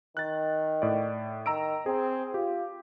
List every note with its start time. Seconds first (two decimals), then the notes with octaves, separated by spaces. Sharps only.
0.17 D#3 F#6 A6
0.82 A2 D5
1.46 D#3 A#5 E6 D7
1.86 C4 G#4
2.34 F4 G4